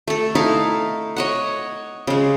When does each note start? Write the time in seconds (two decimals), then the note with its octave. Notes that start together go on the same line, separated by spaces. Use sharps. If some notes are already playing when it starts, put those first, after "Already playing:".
0.08 A3 A4
0.35 D#4 E4 A4 F5
1.17 C#5 D#5 F#5
2.07 C#3 G#3